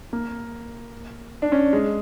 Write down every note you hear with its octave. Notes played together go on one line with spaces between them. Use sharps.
A#3
D4
C#4
G#3